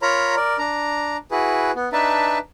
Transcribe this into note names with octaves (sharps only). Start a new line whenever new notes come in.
F4 A#4 C#5 A#5 B5
A#4 D5
D4 A#5
E4 F#4 G#4 B4
B3
D4 D#4 B4 E5 A5